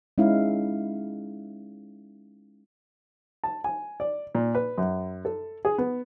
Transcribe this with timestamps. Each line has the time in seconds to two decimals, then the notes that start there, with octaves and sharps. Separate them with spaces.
0.18 G#3 C#4 D#4 E4 F5
3.44 A5
3.64 G#5
4.00 D5
4.35 A#2
4.55 B4
4.78 F#2
5.25 A4
5.65 G#4
5.78 B3